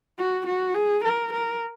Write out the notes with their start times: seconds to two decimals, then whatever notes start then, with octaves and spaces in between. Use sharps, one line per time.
0.19 F#4
0.47 F#4
0.75 G#4
1.04 A#4
1.33 A#4